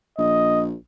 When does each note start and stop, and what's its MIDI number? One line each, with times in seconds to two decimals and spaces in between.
0.18 0.74 34
0.18 0.64 75